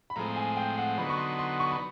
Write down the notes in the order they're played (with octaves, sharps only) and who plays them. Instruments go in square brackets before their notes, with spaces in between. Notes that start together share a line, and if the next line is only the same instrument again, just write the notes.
[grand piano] B5
[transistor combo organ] A2 F3 G#3 C4 [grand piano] A#5
[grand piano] G#5
G5
F#5
[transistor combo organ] D3 F#3 B3 D#4 [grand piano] B5
[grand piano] C#6
C6
C6
C#6
B5